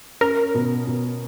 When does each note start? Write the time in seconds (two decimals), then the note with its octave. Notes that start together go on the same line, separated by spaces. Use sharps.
0.21 C#4 A#4
0.55 B2
0.87 B2